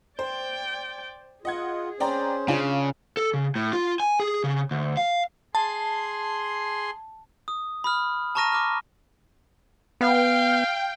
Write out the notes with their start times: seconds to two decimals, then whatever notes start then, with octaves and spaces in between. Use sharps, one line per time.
0.19 C5 D5 G5
1.45 F4 G#4 D#5 F#5 G#6
2.00 C#4 C5 D5 G5 A#5
2.48 C#3 D4 F4
3.17 A4
3.34 C#3
3.55 A2
3.73 F4
4.00 G#5
4.20 G#4
4.44 C#3
4.71 D2
4.97 F5
5.55 G#4 A5 C6
7.48 D#6
7.84 B5 D#6 F6
8.35 A5 A#5 C#6 F6 A#6 D#7
8.52 C#6 D6 F6
10.01 B3 F5 G5